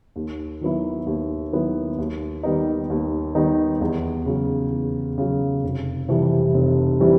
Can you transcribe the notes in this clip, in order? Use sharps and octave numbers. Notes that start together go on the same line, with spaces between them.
D#2
D#3 F#3 B3 E4
D#2
D#3 F#3 B3 E4
D#2
D#3 G3 B3 D#4
D#2
D#3 G3 B3 D#4
E2
C#3 F#3
E2
C#3 F#3
F1
F2 C3 E3 G3
F1
C3 E3 G3